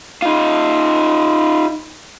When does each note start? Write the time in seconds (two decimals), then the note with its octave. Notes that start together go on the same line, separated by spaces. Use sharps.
0.22 D#4 F4